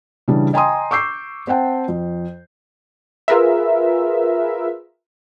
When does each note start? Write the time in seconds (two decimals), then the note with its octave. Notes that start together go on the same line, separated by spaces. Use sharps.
0.28 C#3 E3 G3 D4
0.53 D#5 G5 G#5 A#5 C6 D#6
0.91 C#6 D6 E6 G6 C7
1.47 C4 C5 F#5 G5 A5
1.88 F2
3.28 F4 G#4 A#4 B4 E5